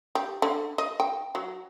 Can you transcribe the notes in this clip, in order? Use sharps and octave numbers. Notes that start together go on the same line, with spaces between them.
G4
D3
D#5
G5
F#3